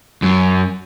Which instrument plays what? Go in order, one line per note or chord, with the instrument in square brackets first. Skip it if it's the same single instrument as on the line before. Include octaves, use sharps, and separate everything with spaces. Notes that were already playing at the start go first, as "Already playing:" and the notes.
[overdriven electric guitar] F#2